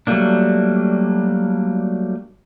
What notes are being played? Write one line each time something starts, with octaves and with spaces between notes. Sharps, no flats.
F#3 G3 A3 A#3 D4